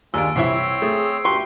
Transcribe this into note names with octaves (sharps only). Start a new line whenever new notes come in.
D#2 G#3 D4 F4 E6 D7
C2 E3 C4 E4 C5 C#5 C7
A3 G#4
D2 G4 B4 C6 C#6